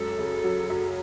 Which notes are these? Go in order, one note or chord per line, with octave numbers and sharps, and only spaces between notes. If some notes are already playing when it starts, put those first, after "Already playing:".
Already playing: F#2 G#3 A4
C#3
F#3
F#2